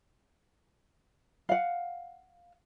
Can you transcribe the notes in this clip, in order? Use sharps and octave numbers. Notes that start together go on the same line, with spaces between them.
F5 F#5